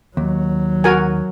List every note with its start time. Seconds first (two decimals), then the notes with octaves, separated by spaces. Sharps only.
0.17 D#2 F#3
0.84 F#4 A#4 G#5